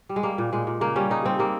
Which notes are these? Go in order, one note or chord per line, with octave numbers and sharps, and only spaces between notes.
G3
G#3
G3 A#3
A#2
A#2 G#3
A#2
C#3 A#3
G3 C#4
C#3 D#4
G3 C4
G3 A#3